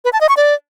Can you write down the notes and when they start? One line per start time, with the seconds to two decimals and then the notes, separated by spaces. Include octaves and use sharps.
0.05 B4
0.13 A5
0.21 D#5
0.29 C#6
0.37 D5